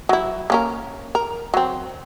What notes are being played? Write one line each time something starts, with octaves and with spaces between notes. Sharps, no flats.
F#3 E4
A#3 C#4 A#4
A#4
F#3 C4